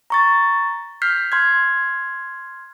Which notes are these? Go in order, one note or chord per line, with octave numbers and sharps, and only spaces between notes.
A#5 C#6 A6
F6 G6 B6 C7
C6 F6 G#6